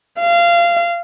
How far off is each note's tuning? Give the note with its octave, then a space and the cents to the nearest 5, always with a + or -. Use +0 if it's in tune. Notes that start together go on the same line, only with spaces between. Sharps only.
F5 -20